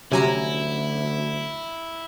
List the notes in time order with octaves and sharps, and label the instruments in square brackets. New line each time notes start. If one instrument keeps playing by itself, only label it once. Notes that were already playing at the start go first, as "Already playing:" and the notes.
[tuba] D2 [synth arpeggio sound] C3 G#5 A#5 [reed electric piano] F#3 C#4 [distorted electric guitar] E4